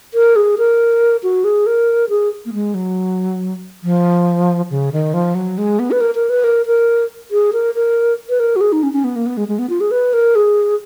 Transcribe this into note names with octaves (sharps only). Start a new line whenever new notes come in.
A#4
G#4
A#4
F#4
G#4
A#4
G#4
A#3
G#3
F#3
F3
C#3
D#3
F3
F#3
G#3
B3
B4
A#4
A#4
B4
A#4
A#4
G#4
A#4
A#4
B4
A#4
F#4
G#4
D#4
C#4
C#4
B3
A#3
B3
G#3
G#3
B3
F4
G#4
B4
A#4
G#4